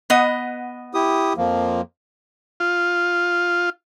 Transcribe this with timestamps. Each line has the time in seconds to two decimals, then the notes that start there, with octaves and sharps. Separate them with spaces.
0.10 B3 D#5 F#5
0.94 E4 G4 D#6
1.37 F2 F3 A#3
2.60 F4